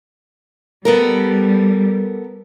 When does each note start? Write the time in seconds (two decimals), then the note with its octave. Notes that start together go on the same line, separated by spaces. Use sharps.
0.85 G3 B3 A4 A#4